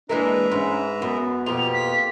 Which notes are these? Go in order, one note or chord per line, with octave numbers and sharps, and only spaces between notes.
E3 G#3 A#3 D4 B4 E5 A#5
G#2 C#4
F#2 B3
F2 B2 A#3 F4 G4 F7
B6